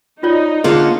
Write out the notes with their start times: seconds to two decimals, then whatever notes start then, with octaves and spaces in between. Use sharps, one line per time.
0.23 D#4 F4 C#5 D5
0.64 D3 A#3 C#4 F4 G#4